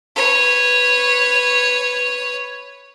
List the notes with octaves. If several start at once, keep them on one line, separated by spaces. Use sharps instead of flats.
B4 C#5